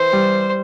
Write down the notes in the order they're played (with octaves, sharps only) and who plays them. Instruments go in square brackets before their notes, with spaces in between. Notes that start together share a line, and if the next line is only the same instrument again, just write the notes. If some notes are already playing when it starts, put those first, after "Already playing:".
Already playing: [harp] E3 [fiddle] C5
[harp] G3